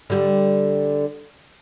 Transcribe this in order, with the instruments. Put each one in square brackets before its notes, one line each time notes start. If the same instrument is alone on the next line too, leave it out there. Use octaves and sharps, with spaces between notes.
[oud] D3 G3